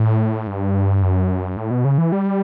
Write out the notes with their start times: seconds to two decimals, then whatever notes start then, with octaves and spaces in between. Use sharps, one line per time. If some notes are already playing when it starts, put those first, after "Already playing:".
Already playing: A2
0.47 G2
1.02 F#2
1.57 A2
1.71 B2
1.85 C#3
1.98 E3
2.12 G3